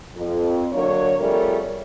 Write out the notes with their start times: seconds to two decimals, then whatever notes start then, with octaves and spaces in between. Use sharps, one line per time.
0.15 F2
0.73 D3 F#3 A#3 C#5
1.19 F2 G3 A3 G#4 A#4 C#5